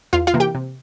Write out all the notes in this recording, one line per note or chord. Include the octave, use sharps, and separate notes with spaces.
E2 F4 F5
F4 F5
C3 E3 A#3
G4 G5
C3